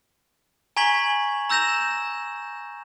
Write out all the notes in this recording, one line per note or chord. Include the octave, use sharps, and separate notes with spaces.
G#5 A#5 C#6 G#6 B6 F#7
A#5 E6 G6 A#6 E7 F7